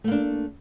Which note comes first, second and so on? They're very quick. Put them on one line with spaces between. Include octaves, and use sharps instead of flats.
A3 A#3 D4